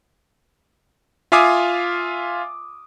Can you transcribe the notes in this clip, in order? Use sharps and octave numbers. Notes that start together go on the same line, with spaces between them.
F4 E5 F5 G#5 D6 D#6